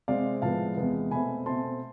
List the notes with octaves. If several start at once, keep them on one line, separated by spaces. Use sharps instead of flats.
C3 G#3 C4 D5 F5
A2 F3 G#3 B3 F5 A5
E2 C3 G#3 B3
B2 A3 C4 G#5 B5
B2 A3 C4 A5 C6